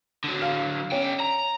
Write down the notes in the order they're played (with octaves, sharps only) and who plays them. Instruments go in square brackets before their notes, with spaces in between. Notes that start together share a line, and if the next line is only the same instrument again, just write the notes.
[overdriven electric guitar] D3 F#3
[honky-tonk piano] F5
[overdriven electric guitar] D3 G5 [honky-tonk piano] C#4
[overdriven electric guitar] A#5